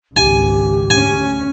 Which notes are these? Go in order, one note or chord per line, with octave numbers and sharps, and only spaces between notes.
G#1 C#2 G4 G#5
D2 C#4 G#5